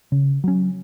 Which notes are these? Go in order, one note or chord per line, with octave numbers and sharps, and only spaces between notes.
C#3
F#3 C#4